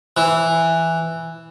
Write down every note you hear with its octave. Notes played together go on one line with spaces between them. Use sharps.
E3